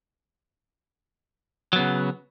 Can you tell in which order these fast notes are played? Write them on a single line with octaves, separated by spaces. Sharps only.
F#3 B3 C#3